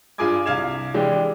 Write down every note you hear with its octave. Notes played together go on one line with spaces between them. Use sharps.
G2 F4 G#4 G#5 D6 G#6
C2 F5 G#6 E7
E3 G#3 D4 G4